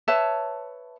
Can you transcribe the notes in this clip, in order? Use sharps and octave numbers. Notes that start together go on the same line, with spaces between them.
B4 C#5 E5 A5